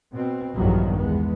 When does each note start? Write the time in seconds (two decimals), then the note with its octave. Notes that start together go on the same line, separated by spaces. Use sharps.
0.12 B2 C4
0.54 A#1 E2 G2 D#3 F3 F#3
0.96 E2 G#3 B3